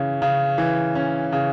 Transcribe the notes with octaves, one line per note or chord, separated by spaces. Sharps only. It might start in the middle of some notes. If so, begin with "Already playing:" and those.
Already playing: C#3 E3 C#4
C#3
E3
C#4
C#3